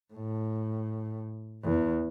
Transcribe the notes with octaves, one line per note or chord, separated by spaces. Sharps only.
A2
E2